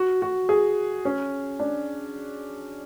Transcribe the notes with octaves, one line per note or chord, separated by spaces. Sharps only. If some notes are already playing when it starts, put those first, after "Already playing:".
Already playing: F#4
F#4
G#4
C#4
D4